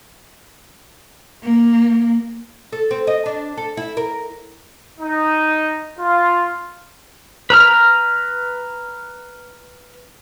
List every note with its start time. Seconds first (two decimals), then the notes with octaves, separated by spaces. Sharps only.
1.43 A#3
2.73 A4
2.91 C4
3.07 D#5
3.26 D4
3.57 A4
3.77 E4
3.97 A#4
4.99 D#4
5.99 F4
7.50 B4 A#5 F6